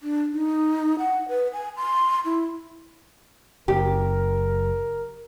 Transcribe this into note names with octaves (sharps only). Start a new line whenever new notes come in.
D4
D#4
F#5
B4
G#5
C6
E4
F#1 G4 A#4